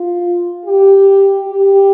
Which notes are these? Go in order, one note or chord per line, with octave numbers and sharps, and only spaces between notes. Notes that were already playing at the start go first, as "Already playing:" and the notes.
Already playing: F4
G4
G4